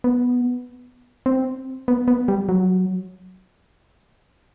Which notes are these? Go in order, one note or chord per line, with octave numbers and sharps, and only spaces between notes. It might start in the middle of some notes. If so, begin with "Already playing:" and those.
B3
C4
B3
B3
G3
F#3